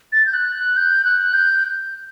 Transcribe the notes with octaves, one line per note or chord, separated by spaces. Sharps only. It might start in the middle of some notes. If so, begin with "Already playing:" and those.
A6
G6
F#6
F#6
G6
F#6
G6